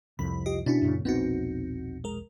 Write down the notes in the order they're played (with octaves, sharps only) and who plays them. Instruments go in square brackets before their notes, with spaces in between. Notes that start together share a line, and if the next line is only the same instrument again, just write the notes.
[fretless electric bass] C2 F2 [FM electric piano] B5
[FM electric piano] F4 G4 D#5
[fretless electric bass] B2 C#4 [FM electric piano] D4 E4 F#4
[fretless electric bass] F#2 A#2 C#3
[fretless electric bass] E1 A#1 B3 [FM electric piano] C4 D#4 F#4
[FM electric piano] G#3 A#4